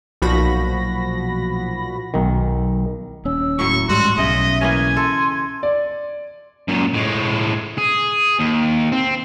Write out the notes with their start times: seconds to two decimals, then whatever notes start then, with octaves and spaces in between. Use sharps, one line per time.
0.22 B1 A#2 F3 F#4 B5 A#6
2.14 B1 D#3
3.25 D#1 C#4 E6
3.59 A2 F#3 C#6
3.89 A1 G#2 G3 F#4 C6
4.18 B1 C#3 D#5 E5
4.61 E3 A#3 C#4 G#5
4.96 A4 C6
5.63 D5
6.68 F#2 A#2
6.94 A2 G#3
7.78 G#4
8.39 D#2
8.92 C4